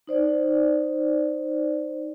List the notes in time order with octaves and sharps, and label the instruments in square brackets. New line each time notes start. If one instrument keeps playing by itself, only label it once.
[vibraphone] D#4 C5 D5